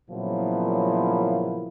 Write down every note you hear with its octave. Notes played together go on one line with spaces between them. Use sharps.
A#2 C#3 F3 F#3 B3 E4